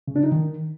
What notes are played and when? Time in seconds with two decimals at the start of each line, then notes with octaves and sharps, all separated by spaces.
0.08 C#3
0.16 D4
0.24 D#4
0.32 D#3